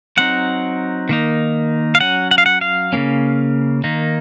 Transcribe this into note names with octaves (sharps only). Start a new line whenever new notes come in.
F#3 C4 D#4 F#5
D#3 A#3 D#4
F5
F#3 C#4 F#5
F#5
F5
F#5
F5
C#3 F3 A#3 C#4
D#3 A#3 D#4